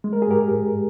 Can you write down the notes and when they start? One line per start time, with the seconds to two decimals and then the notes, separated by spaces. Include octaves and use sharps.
0.04 G#3
0.13 A#4
0.22 G#4
0.28 G#2 G4 A#4
0.51 G#2